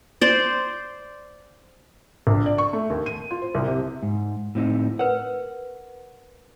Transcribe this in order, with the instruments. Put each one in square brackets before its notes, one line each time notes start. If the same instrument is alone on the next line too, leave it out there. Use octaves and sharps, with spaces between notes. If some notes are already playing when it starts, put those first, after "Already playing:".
[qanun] C5 D5
[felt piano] A#1
D5
C#6
A3
D#2
D#7
F4
C5
C2
C3
[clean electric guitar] G#2
A2 C4 D#4
[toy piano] A#4 B4 [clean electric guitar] F#5